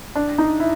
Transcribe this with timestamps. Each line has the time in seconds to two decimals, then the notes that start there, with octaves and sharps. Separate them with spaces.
0.15 D4
0.38 D#4
0.60 E4